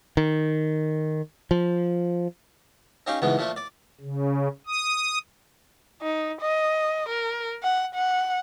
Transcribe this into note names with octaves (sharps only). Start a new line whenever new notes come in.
D#3
F3
C#4 D#4 G4 F5
C#2 G#2 B2 E3 B3
A#2 F3 A3
D5
C#3
D#6
D#4
D#5
A#4
F#5
F#5